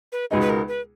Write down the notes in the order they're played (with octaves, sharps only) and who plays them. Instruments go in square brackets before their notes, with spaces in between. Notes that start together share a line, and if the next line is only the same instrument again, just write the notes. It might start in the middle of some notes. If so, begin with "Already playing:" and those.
[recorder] B4
[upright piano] C#2 B2 G#3 B3 D#4 [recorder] G#4
[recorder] B4
A#4
B4